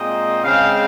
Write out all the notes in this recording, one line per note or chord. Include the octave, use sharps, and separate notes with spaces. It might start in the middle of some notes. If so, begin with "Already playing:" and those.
Already playing: A#2 G#3 C4 D#5
C#3 G#3 C4 F5